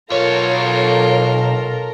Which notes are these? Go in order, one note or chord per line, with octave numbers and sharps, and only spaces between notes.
B1 F4 A4 A#4 C#5 A#5